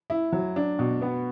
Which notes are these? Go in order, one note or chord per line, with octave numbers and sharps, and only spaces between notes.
E4
F#3
D4
B2
B3